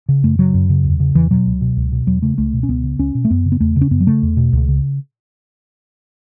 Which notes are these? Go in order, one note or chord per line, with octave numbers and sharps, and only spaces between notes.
C#3
F#2 A3
C#3 F#3
F#2
C#3
E2
C#3
E2 E3
B2 F#3
C#2
B2
C#2
B2
E2 F#3
C#3 A3
C#2 A3
B2
C#4
C#2 B3
C#3
C#2 C#4
B2
A3
F#2 B3
C#3
B3
E2 A3
C#3
C#4
F#2 B3
F#3
C#3 A3
E2
B2
C#2
C#3